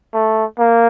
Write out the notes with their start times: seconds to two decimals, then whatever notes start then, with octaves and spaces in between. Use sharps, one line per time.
0.13 A3
0.59 A#3